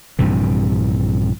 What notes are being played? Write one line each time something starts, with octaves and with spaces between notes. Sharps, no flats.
A#1 G2 C3 E3